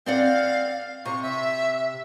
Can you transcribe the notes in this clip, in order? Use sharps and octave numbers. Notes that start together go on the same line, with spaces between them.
C4 D5 F5 F#5
C3 C#6
E5